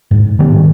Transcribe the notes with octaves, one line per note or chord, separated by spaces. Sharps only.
G#2
D#3 G3 B3